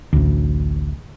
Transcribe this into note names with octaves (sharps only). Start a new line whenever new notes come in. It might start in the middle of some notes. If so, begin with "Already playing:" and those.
A1 D2